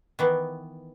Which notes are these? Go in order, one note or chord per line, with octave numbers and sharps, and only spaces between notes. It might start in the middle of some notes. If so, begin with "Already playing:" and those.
D#3 E3 B3